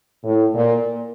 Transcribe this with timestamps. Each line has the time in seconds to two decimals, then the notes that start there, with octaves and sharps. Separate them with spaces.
0.24 A2
0.54 A#2